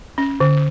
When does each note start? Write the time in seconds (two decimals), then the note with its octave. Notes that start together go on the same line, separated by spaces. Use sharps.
0.18 C#4
0.40 D3